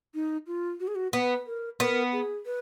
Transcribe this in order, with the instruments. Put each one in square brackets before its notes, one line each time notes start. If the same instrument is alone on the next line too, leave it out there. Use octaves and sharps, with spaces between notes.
[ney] D#4
F4
F#4
G#4
F#4
[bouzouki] B3 [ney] B4
[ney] A#4
[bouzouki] B3 [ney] A#4
[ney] G#4
B4